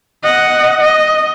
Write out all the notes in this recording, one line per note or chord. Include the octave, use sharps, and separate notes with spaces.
D#5 F#5
D#5